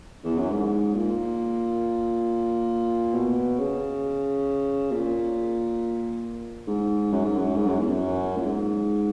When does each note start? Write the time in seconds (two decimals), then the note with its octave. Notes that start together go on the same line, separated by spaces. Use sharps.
0.24 E2
0.37 F#2
0.50 G#2
0.94 A#2
3.14 B2
3.59 C#3
4.92 A#2
6.67 G#2
7.12 F#2
7.24 G#2
7.37 F#2
7.56 G#2
7.67 F#2
7.80 E2
7.91 F#2
8.36 A#2
8.45 G#2